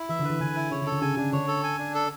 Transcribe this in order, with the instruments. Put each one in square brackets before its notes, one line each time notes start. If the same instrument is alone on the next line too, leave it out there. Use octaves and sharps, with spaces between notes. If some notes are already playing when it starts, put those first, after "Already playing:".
Already playing: [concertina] E4
[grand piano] E3 [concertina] E5
[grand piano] D3
[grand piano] E3 [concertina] B4
[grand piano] D3 [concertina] G#5
[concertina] E4
[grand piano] C#3 [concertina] C#5
[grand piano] D3
[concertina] A4
[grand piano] D3
[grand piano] C#3 [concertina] G#5
[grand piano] C#3 [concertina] D4
[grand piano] D3 [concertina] C#5
[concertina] A4
G#5
D4
A4